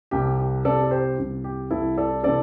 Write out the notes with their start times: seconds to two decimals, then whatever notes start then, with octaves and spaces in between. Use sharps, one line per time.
0.11 C2 C3 G3 G4
0.39 G4
0.65 C2 C3 G3 A4 D5
0.83 A4
0.91 G4 C5
1.18 C2 C3 E3
1.44 G4
1.71 C2 C3 E3 E4 A4
1.97 A4 D5
2.23 C3 E3 A4 D5